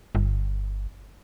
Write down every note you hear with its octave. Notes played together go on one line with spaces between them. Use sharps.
G1